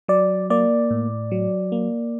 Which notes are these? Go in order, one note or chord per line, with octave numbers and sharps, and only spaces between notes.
F#3 D5
A#3 D5
A2
F#3
A#3